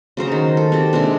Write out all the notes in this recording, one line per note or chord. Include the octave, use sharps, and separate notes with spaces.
C#3 F#3 C5 A#5
D#3
A4
C4 G4
C3 G#3 C4 D4